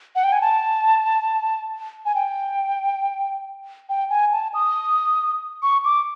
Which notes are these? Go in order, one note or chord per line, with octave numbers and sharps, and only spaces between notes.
F#5
G5
G#5
A5
G#5
G5
G5
G#5
A5
D#6
C#6
D6